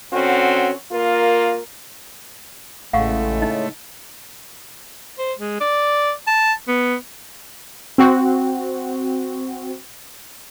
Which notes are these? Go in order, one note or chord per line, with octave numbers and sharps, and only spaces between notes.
D3 C4 C#4 F#4
A#3 F4 A#4
A1 A2 C#3 G#3 A3 F5 F#5 C#6
D#4 D#5
C5
G#3
D5
A5
B3
C4 F#4